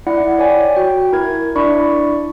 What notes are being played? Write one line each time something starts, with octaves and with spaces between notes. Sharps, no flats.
E4 D5 F#5
C#5 D5 G5 G#5
F#4 G5
E4 A#4 G#6
D4 E4 D5 B5 C#6